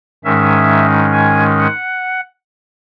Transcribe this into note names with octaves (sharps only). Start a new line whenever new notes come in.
G#2 D#3 G#3 C#4 E5
G#5
F#5